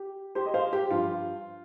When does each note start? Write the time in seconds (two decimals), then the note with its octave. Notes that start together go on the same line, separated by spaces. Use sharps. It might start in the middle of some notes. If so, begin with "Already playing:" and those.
Already playing: G4
0.35 G4 C5
0.46 D#5
0.54 C5 F5
0.73 G4
0.91 G2 F3 F4